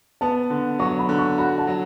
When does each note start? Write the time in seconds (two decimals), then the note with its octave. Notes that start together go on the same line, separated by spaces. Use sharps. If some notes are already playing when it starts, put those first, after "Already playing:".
0.21 B3 A5
0.50 D3
0.79 F#3 C#6
0.99 B5
1.09 D3
1.19 C#6
1.38 F#4 B5
1.58 A5
1.67 F#3